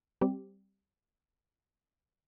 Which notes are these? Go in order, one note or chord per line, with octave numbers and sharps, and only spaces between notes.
G3 C4 G4